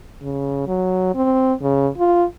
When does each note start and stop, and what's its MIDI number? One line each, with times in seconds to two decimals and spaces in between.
0.23 0.67 49
0.67 1.13 54
1.15 1.53 60
1.62 1.88 49
1.98 2.25 65